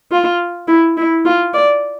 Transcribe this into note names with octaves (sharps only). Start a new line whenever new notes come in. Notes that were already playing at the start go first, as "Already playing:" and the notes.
F4
E4
E4
F4
D5